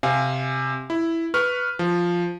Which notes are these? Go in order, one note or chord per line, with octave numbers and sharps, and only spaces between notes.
C3 F5 G#5
E4
B4 C#6 F6
F3